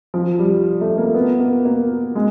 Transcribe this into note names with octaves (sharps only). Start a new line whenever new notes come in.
F3
G3
A3
A#3
B3
A#3
A#3
G#3